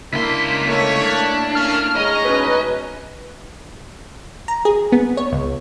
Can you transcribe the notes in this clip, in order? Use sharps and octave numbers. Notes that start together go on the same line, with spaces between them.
C#2 A#3 D4 E4 C6 B6
A3 A#3 C#5
D4
A#3 C#4 F6
G#3 C#5 D#5 A#5
B2 C#4 D#4 B4
A#5
G#4
B3
C#5
C#2